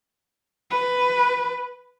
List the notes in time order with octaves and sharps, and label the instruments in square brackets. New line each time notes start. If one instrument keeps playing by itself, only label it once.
[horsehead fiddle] B4